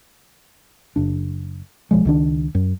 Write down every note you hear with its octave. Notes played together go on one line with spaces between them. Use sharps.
F#1 D4
B1 F3 G#3
C#2 D#3 D4
F#2